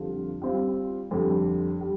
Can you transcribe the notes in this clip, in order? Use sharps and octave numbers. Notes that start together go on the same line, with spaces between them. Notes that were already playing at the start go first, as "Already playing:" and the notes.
Already playing: F2 D3 G3 C4 F4
G3 C4 F4
F2 D3 G3
G3